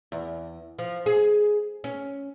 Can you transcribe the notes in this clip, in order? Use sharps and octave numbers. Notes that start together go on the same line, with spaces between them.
E2
F3
G#4
C#4